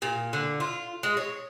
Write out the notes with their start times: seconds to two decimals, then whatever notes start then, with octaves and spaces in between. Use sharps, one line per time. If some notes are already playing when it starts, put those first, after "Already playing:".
0.02 A#2
0.33 D3
0.60 F4
1.03 G#3
1.17 C#5